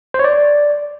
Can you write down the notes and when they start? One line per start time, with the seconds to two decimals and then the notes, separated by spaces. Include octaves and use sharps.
0.14 C5
0.19 C#5
0.24 D5